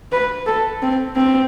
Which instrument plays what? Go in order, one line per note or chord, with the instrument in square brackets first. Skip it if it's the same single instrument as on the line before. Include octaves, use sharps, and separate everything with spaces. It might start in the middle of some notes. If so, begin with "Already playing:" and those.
[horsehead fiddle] B4
A4
C4
C4